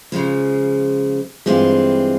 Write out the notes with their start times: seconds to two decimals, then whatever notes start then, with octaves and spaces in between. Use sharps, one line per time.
0.12 C#3 F3 G#3
1.46 G2 E3 G#3 C4 F4